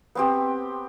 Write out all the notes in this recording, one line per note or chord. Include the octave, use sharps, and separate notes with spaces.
B3 C4 G4